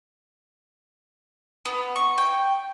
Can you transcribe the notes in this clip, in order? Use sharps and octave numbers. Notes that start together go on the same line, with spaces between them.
B3
C#6
G5